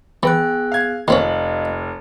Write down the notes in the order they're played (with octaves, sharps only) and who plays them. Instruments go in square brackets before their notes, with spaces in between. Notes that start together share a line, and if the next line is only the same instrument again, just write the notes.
[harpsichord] E3 [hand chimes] B3 G#4 F#6 [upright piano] G5
[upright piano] F5 G#6
[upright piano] F1 F#7 [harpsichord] D#3 C4 C#4 [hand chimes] D#5 F5